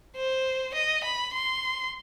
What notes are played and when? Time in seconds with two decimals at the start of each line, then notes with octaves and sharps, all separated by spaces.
0.16 C5
0.75 D#5
1.04 B5
1.34 C6